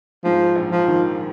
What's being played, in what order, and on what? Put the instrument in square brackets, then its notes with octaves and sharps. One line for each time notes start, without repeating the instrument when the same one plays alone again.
[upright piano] G#2 [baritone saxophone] F3
[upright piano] A#1
[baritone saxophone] F3
[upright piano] D#3